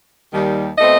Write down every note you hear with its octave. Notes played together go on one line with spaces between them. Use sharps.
D#2 D#3 G3
B2 A3 C4 D#5